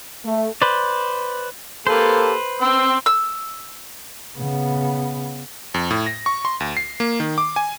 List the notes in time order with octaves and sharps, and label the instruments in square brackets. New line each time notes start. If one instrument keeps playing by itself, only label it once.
[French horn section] A3
[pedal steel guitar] B4 C5 D5
[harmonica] A#3 G4 A4 [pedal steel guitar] B4 C5
[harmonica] C4 C6 E6
[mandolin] E6
[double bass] C#3 B3
[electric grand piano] F2
A2
A#6
C#6
C6
D2
C7
A#3
D#3
D6
G#5